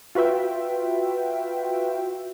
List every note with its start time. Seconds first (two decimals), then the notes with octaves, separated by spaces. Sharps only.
0.15 F4 F#4 B4 E5 G5